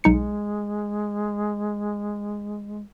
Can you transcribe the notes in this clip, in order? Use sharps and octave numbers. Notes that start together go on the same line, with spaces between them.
B1 G#3 D#4 C#7